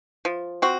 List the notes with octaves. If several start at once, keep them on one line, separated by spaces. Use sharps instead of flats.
F3
C4 F#4